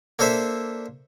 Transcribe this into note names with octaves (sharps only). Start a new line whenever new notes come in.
A#3 D4 A4 C5 E5